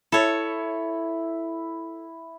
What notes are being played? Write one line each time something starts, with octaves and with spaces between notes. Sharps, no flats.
E4 A4 C#5